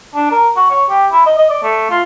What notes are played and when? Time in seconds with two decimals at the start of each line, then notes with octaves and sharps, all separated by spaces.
0.15 D4
0.31 A#4
0.56 F#4
0.70 C#5
0.90 G4
1.12 E4
1.26 D#5
1.38 D#5
1.50 D5
1.63 A3
1.90 F4